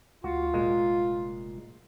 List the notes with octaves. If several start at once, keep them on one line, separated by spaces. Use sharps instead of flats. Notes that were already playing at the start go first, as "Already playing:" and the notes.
D2 F4 F#4
F1 A#2 G#3